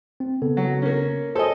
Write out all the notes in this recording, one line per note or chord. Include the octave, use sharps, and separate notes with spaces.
C4
C#3 B3 A4
F#3
A#3 C#4
A4 C5 C#5 D#5 G#5